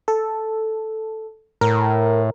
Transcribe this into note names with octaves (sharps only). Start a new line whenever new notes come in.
A4
A2 A#4